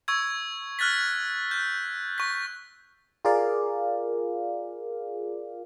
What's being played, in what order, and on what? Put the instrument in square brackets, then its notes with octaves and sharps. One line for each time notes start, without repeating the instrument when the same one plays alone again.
[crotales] C#6 E6 G#6
F6 F#6 A6 B6
F6 G6
C#6 B6
[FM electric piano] F4 G#4 A#4 D5 F5